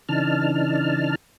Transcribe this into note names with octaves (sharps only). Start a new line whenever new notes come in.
C#3 E3 D4 D#4 A5 F6